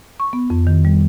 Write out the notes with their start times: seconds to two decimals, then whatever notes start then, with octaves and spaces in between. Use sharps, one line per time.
0.20 C#6
0.33 B3
0.50 F2
0.67 D#3
0.85 G3